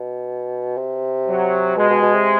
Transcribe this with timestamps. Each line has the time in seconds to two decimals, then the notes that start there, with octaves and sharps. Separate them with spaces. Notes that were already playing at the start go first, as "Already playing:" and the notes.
Already playing: B2
0.77 C3
1.27 F#3
1.77 B2 G#3
1.90 B2
2.02 B2
2.15 C3